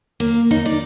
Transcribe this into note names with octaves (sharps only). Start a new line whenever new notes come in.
A#3
D#4
D5